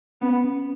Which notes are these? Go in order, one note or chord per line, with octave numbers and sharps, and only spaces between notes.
B3 C#4
C#4